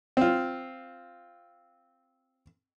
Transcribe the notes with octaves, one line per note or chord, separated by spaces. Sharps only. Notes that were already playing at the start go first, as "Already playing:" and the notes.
C4 F4